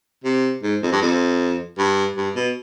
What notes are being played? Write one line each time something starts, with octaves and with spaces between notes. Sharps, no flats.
C3
G#2
F2
G2
F2
G2
G2
B2